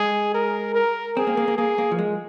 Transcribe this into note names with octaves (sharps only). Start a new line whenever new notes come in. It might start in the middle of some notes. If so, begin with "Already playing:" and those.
Already playing: G#3 G#4
A#4
A#4
C4 G#4
A#3
A#3
A#3
A#3 G#4
A#3
F3
G#3